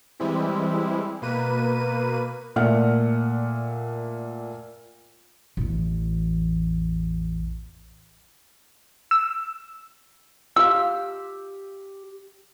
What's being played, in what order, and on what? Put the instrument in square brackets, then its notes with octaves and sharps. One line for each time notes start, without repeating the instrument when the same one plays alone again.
[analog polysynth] E3 G3 G#3 C4 E4
B2 A#3 B4 D#7
[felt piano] A#2 A3 A#3 D5 F#5 F6
[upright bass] A1 E2
[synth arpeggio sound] E6
[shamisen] F4 F5 [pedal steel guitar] G4 E6